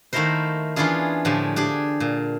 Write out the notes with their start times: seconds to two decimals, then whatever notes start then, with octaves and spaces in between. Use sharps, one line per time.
0.13 D#3 A3 A#3 E4 A#4 C5
0.76 E3 B3 C#4 D4 F4 G#4
1.25 A2 D3 F3 G4 G#5
1.56 D4 G4 G#4
2.00 A#2